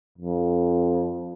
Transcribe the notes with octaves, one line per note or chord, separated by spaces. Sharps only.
F2